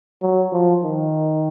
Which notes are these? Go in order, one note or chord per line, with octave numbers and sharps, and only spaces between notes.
F#3
F3
D#3